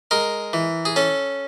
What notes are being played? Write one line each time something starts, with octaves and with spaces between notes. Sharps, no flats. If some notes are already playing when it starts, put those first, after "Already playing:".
G#3 A#4
E3
G#4
C#4 A4